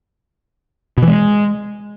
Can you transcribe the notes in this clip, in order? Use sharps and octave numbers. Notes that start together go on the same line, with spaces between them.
B2
E3
G#3